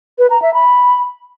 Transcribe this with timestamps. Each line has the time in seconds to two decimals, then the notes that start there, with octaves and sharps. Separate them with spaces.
0.19 B4
0.30 A#5
0.42 E5
0.54 B5